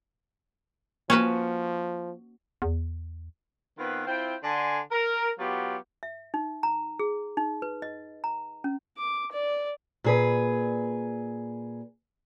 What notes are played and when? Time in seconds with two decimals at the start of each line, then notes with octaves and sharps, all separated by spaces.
1.10 F3 A#3 C#4 F#4 B4
2.62 E2
3.78 D#3 B3 C4 F4 B4
4.07 C4 E4 F4 G5
4.44 D3 G#5 C6
4.91 A#4
5.39 F#3 B3 F4 G4
6.03 E5
6.34 D#4
6.63 A#5
6.99 G#4
7.37 D#4
7.62 B4
7.82 D#5
8.24 A#5
8.64 C#4
8.97 D6
9.32 D5
10.04 A#2 G#4 B4